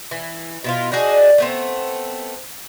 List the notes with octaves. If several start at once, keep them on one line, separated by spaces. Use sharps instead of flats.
E3
B2 E4 F4
D4 D#4 F#4 G#4
A3 B3 C4